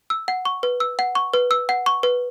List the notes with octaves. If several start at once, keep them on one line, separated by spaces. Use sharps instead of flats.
E6
F#5
C#6
B4
E6
F#5
C#6
B4
E6
F#5
C#6
B4